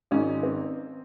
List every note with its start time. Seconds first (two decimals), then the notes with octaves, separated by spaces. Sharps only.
0.11 G#1 G#2 D#3 C#4
0.43 C4